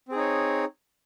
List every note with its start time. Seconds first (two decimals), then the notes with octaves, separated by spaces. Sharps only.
0.08 C4
0.12 G#4
0.15 D#4
0.19 C#5